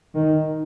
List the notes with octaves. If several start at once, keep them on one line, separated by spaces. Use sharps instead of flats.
D#3